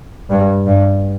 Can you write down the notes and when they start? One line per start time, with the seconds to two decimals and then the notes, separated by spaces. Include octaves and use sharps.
0.29 G2
0.66 G2